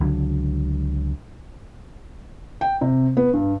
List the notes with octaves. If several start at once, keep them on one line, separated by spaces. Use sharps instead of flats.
C#2 D3 F#3
G5
C3
B3
G2